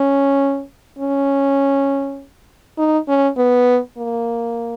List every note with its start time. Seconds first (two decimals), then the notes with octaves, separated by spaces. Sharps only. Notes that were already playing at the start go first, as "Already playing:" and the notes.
Already playing: C#4
0.99 C#4
2.78 D#4
3.08 C#4
3.37 B3
3.97 A#3